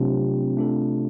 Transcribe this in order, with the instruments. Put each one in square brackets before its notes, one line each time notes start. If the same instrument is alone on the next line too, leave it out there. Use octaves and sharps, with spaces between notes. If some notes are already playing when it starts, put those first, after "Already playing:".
Already playing: [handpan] C3 [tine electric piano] F#3 A3 D4 F4
[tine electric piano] A3 D4 F4 A4